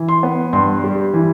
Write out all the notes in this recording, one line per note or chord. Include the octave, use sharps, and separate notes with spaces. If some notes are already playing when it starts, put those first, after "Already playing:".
Already playing: E3
C6
B3
G2 C6
G3
E3